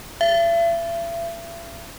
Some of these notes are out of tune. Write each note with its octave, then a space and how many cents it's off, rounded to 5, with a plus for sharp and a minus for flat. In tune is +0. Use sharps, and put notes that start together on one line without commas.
E5 +40